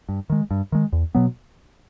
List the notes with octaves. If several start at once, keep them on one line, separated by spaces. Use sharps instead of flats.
G2
D#3 G#3
G2
D#3 G#3
E2
B2 F#3 B3